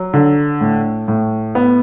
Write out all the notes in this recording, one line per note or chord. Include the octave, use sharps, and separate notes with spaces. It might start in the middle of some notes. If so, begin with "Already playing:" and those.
Already playing: F#3
D3
A2
A2
B3